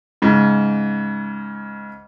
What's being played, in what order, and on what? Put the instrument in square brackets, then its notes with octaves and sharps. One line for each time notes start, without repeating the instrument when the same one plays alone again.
[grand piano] G#2 C#3